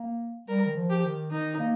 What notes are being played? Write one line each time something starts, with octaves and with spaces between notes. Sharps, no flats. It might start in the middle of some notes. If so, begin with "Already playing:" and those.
Already playing: A#3
G3 A#4
D#3
F3
G4
D#3
D#3 D#4
A#3